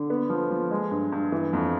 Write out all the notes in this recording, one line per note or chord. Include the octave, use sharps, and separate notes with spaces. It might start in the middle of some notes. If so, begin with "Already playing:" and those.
Already playing: D3
B3
F3
F3
G#3
G2
G2
E3
F2